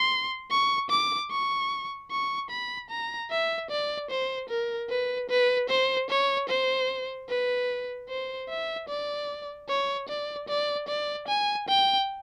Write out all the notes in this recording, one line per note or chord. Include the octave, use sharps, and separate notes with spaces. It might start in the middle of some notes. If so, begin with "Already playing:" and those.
Already playing: C6
C#6
D6
C#6
C#6
B5
A#5
E5
D5
C5
A#4
B4
B4
C5
C#5
C5
B4
C5
E5
D5
C#5
D5
D5
D5
G#5
G5